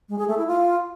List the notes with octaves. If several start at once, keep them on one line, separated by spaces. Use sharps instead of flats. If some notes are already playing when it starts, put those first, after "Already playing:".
G#3
G#4
A3
E4
F4